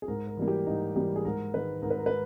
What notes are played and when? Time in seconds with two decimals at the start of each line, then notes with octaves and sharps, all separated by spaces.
0.02 G#4
0.08 G#2 A#4
0.27 A#4
0.37 E3 G3 A#3
0.48 G4
0.67 G#2 D#4
0.95 E3 G3 A#3 G4
1.16 G#4
1.25 G#2 A#4
1.54 D#3 G#3 B4
1.82 G#2 A#4
1.91 B4
1.99 A#4
2.06 B4